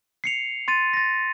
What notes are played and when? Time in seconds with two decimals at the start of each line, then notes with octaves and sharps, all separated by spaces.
0.24 C7 C#7 F7
0.68 C6 A6 D#7
0.93 A6 A#6